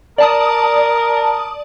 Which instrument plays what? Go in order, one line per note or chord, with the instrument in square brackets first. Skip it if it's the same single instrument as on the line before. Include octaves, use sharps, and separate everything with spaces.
[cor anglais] A#4 [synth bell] D5 A5 D#6